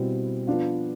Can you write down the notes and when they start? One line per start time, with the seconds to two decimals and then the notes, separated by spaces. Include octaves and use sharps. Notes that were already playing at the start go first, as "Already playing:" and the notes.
Already playing: B2 G3 C4 E4
0.47 F3 B3 D4 F4